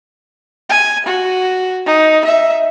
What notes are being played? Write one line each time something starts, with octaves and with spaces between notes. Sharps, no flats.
G#5
F#4
D#4
E5